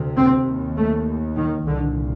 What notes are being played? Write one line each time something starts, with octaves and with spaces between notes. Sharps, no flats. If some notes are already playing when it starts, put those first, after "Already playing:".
Already playing: D2 C3
C4
D#2
A3
D#3
C2 A#2 D3